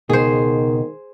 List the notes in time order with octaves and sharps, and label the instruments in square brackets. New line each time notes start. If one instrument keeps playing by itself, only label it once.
[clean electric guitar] C#2 B2 [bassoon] D#3 [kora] G#4 C5